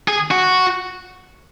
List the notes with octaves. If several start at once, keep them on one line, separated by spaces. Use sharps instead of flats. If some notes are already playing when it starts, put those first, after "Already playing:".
G#4
F#4